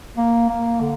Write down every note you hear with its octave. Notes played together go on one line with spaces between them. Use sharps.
A#3
A#3
D3